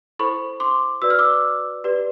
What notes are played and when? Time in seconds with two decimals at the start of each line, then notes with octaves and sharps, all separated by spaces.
0.19 E4 A4 C5 B5 C#6
0.60 C6 D6
1.02 F#4 B4 D5 E6
1.10 F6
1.19 D6 E6
1.84 G4 B4 D5